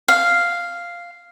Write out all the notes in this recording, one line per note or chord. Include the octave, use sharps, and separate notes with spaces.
F5